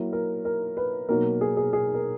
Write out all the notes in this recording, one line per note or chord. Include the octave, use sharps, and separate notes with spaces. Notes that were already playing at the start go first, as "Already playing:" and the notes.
Already playing: F#3 A#3 E4 A#4
A#4
A#4
B4
B2 F#3 A#3 D#4 A#4
G#4
G#4
G#4
A#4